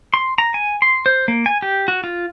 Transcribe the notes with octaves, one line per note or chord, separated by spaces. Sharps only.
C6
A#5
G#5
C6
C5
A#3
G#5
G4
F#4
F4